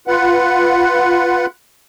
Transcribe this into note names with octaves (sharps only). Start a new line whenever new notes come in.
F4 B4 F#5